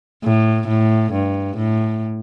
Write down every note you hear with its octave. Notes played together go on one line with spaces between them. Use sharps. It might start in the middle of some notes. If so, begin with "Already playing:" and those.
A2
A2
G2
A2